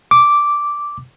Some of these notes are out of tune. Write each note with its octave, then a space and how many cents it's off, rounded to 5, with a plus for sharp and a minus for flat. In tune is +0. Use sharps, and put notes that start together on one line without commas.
D6 -5